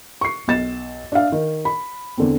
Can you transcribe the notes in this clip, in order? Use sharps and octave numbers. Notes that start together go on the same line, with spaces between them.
C#6 C7
B1 A6 E7
D4 E5 F5
D#3
B5
E2 D3 C4